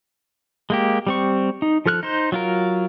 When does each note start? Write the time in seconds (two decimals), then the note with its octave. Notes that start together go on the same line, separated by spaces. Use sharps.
0.70 G#3 A#3 G4
1.07 G3 C4 C#6
1.62 D#4
1.86 F3 A4 F6 F#6
2.03 D#4 C5
2.32 F#3 F4 A#4